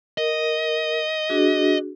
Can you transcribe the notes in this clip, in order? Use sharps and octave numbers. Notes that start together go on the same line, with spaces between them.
A#4 D#5
D4 F#4 G#4